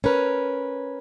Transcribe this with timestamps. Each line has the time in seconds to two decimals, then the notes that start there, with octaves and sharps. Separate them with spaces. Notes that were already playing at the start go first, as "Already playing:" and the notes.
0.04 C#4 A#4 B4